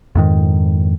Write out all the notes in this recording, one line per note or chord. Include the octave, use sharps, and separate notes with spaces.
F2 G#2 D#3